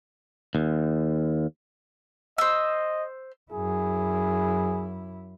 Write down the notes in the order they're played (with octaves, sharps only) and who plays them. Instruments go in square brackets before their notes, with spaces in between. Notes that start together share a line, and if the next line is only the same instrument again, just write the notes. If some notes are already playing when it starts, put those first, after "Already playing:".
[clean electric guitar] D#2
[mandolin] C5 E6 [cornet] D#5
[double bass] F#2 E4 [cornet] G#4